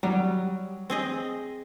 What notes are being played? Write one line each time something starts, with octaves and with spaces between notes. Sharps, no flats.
F#3 G3
C4 G#4 D#5